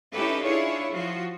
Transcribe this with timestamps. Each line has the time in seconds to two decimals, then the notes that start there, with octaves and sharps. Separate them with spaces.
0.13 C#4 D#4 E4 G4 A4 B4
0.44 D4 E4 F4 G#4 C#5
0.91 F3 F4 F#4